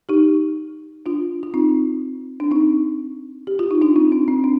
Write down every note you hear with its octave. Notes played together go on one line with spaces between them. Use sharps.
D#4 G4
D4 F4
F4
C4 D#4
D4
C4 D#4
G4
F4
D#4
D4 F4
C4 D#4
D4
C4
D4